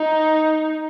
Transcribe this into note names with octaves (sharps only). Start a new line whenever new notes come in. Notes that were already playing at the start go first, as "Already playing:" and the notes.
Already playing: D#4